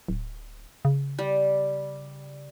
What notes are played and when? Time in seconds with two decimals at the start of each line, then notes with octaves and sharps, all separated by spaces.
0.08 D1
0.85 C#3
1.19 G3